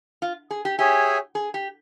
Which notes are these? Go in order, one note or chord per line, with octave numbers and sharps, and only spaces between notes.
F4
G#4
G4
G4 G#4 C#5 E5 G#5
G#4
G4